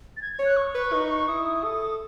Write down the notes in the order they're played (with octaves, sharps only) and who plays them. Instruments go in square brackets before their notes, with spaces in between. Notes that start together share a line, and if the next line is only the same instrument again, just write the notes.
[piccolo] A6
G#6
G#6
[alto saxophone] C#5
[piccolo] F#6
C#6
[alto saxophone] B4
D#4
[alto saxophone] E4 [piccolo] D#6
[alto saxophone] A4
[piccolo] D#6